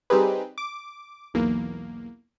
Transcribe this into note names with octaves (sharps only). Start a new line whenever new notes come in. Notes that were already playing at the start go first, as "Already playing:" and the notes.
G3 C4 D#4 G4 G#4 B4
D6
B1 E2 A#3